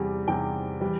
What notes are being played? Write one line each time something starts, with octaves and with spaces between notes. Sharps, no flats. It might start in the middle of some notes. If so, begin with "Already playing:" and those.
Already playing: E2 C3 G3
E2 C3 G3 G5
E3 G3